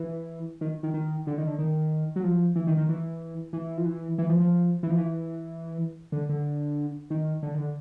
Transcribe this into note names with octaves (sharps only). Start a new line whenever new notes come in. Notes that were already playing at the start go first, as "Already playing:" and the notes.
Already playing: E3
D#3
D#3
D#3
D3
D#3
D3
D#3
F#3
F3
E3
D#3
D#3
E3
E3
F3
E3
E3
F3
F3
E3
F3
E3
D3
D3
D#3
D3
D#3
D3